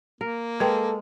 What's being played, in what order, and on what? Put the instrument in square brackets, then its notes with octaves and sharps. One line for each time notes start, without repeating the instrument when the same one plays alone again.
[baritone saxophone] A#3 [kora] A#4
[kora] G#3 [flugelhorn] A4 [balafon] B4 G5